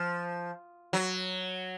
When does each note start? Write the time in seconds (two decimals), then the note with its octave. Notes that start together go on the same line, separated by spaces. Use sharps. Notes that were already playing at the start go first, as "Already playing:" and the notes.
Already playing: F3
0.93 F#3